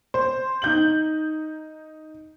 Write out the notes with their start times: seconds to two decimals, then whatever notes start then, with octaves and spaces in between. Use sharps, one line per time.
0.14 C5
0.62 D#4 G6 F#7